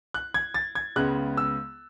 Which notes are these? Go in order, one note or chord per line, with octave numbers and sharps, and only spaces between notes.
F#6
G#6
A6
G#6
C#2 C#3 G#3 B3 F#6
E6